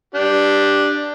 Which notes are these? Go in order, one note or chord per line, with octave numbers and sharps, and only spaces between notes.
D4 G4